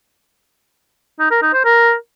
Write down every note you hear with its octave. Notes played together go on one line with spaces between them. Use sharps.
D#4
A#4
D#4
C5
A#4